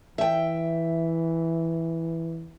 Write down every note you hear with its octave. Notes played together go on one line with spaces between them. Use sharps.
E3 E5 G5